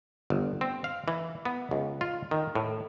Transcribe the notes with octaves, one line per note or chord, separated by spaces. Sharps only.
G1
C4
F5
E3
B3
C#2
F4
D#3
A2